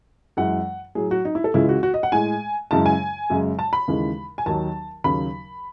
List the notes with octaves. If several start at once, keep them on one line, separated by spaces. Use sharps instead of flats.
F#2 E3 G#3 F#5
A2 F#3 G#4
F#4
D#4
E4
A4
C#2 C#3 E3 G#3 E4
F#4
F#4
D#5
F#5
A2 G#3 G#5
F#2 C#3 E3 G#3 A5
G#5
F#2 C#3 G#3
A5
B5
D#2 C#3 E3 G#3
G#5
D#2 D#3 F#3 A5
D#2 C#3 F#3 B5